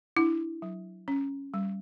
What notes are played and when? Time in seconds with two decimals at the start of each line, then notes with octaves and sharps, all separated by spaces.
0.17 D4 E4
0.62 F#3
1.08 C#4
1.54 G3